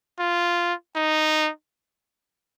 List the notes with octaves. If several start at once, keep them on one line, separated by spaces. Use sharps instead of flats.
F4
D#4